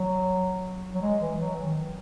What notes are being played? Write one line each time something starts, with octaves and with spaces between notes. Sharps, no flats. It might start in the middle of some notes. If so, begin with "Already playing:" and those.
Already playing: F#3
F#3
G#3
E3
F#3
D#3